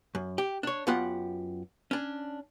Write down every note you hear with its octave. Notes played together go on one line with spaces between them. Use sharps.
F#2
G4
D4 C#5
F#2 B3 F4 G4 F#5
C#4 D4